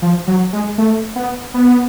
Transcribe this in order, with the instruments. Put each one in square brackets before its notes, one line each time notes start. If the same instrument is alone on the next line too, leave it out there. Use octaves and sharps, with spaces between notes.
[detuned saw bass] F3
F#3
G#3
A3
B3
B3